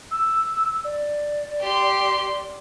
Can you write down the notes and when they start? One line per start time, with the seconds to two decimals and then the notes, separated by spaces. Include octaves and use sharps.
0.11 E6
0.84 D5
1.61 G4 C6